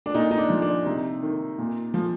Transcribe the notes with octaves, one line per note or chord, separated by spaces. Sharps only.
D4
A#2 D#4
D#4
D4
F3
D4
C3 D#4
D#3
A#2
F3